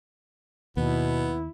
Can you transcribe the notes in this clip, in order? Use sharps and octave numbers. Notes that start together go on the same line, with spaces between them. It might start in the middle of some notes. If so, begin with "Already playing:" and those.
D#2 B2 B3 E4